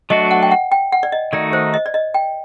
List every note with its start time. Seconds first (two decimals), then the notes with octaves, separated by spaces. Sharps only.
0.10 F#3 A3 D4 F#4 D#5
0.31 F#5
0.43 G5
0.51 F#5
0.72 G5
0.93 F#5
1.03 D5
1.12 D#5
1.33 D#3 A3 D#4 F#4 D5
1.53 C5
1.74 D#5
1.86 D5
1.94 D#5
2.14 G5